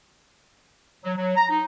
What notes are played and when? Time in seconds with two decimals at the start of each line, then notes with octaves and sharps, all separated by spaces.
1.04 F#3
1.17 F#3
1.37 A#5
1.50 D#4